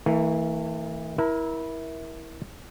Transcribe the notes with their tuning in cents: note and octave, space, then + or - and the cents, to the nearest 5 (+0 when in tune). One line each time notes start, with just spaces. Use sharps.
E3 -30 A3 +40
E4 -15 A#4 +25 A#5 -35